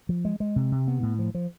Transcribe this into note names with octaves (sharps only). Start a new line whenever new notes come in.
F3
G#3
G#3
C3
C3
B3
A2
F3
F3